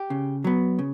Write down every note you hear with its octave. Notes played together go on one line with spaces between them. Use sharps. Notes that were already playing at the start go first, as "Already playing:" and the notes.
Already playing: G4
C#3
F#3 B3
C#3